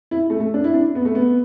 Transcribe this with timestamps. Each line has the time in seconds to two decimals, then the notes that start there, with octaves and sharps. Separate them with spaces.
0.11 E4
0.30 A3
0.40 A3
0.54 D4
0.64 E4
0.74 D4
0.95 B3
1.05 A3
1.15 B3